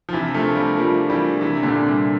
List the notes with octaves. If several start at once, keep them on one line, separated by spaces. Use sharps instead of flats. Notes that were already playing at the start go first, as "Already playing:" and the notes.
F3
C3 E3 D4
F3 A3 A#4
G3 A3 A#3
G3 A#3 F4
D4
E3 G3
A#4
C3 E3 D4
A#2 D3 A#4
C3 G3